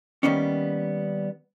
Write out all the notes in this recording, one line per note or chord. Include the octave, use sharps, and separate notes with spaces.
D#3 G3 A#3 B3 C#4